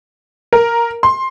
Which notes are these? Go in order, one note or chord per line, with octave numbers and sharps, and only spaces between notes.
A#4
C6